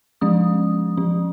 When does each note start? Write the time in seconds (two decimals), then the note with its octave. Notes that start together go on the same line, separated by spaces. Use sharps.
0.21 F3 G#3 C#4 D#6
0.97 F3 C#4